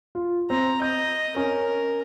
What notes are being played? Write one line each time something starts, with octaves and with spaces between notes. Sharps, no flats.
F4
C4 A#5
D#5 G6
C#4 A#4